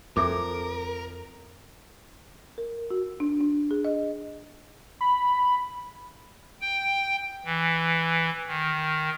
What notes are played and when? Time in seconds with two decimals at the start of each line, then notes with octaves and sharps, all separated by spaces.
0.17 F2 A4 A#4 E5 D6
2.58 A#4
2.90 F#4
3.20 D4
3.41 D4
3.71 G#4
3.85 D#5
5.01 B5
6.61 G5
7.45 E3
8.47 D#3